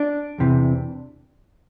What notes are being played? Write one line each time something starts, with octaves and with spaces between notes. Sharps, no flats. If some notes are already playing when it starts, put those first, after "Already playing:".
Already playing: D4
E2 C3 E3